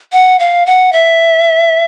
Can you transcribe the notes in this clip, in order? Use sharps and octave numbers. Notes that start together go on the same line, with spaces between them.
F#5
F5
F#5
E5